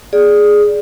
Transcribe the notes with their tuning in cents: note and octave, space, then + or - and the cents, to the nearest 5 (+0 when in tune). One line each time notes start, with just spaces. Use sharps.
G#4 +0 D5 +0